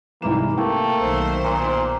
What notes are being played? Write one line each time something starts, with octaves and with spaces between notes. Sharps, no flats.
C2 G#2 E3 A#3 E7
A3 A#3 G5
B1 D#3 C5
A#2